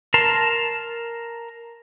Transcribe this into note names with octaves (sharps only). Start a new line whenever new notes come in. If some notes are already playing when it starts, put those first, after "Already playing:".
A#4 A5 C6